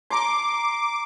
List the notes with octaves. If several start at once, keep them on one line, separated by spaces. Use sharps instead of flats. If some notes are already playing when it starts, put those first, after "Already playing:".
A#5 C6 D6